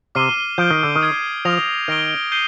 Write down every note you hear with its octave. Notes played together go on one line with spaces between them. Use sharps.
C3 D6 F6 C7 D#7 G7
F3 G6 D7 G7
D#3
D3
D#3
D#6 G#6 C7 D#7
F3 D#6 A#6 F7
D#3 F6 A#6 D7 G7
G6 C7 D#7 G7